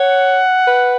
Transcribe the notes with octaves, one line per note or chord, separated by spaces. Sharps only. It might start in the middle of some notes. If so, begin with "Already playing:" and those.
Already playing: C#5 F#5
B4